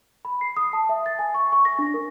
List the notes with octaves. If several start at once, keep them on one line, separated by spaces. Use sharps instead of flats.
B5
C7
D#6
A5
E5
A6
G#5
C#6
C#6
A#6
D4
A#4